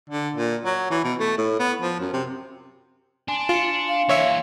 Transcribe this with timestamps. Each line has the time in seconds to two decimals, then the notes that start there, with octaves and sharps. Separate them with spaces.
0.10 D3
0.36 A#2
0.65 F#3
0.91 E3
1.04 B2
1.20 A3
1.38 A2
1.59 B3
1.82 F3
2.00 F#2
2.13 C3
3.28 D4 G#5 C6
3.49 F4 C6 C#7
3.88 F5
4.09 E3 A#3 C#5 E5 C#6